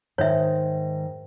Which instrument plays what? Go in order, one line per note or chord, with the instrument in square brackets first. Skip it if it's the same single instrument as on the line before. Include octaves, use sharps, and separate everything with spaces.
[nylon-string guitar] G#2 D#3 [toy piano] C#5 E5